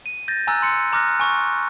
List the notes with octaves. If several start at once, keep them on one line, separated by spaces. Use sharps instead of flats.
D#7
G6 A6 A#6
G#5 A#5 E6 F#6 A6
C6 C#7
A#5 D6 F6 F#6 A#6
G#5 C#6